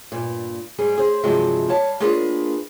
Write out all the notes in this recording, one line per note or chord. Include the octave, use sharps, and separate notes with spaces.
G2 A#2
G#2 G3 G#4 G#5
G#4 C5
G2 C3 D#3 F3 F#3 G#3
G3 C#5 F5 A5
A#3 D4 F4 G#4 B4